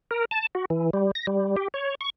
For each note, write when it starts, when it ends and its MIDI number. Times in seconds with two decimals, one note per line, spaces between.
0.11 0.25 70
0.31 0.47 81
0.55 0.65 66
0.70 0.90 52
0.93 1.11 55
1.15 1.26 94
1.27 1.56 55
1.56 1.68 67
1.74 1.95 73
2.01 2.10 85